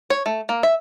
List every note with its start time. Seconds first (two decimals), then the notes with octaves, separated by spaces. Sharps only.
0.10 C#5
0.26 A3
0.49 A#3
0.63 E5